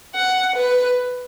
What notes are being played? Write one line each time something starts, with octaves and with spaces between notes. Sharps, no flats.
F#5
B4